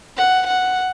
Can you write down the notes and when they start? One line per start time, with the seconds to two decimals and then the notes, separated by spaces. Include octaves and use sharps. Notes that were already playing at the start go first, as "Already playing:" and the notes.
0.17 F#5
0.47 F#5